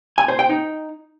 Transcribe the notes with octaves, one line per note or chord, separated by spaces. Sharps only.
G#5
C5
G5
D#4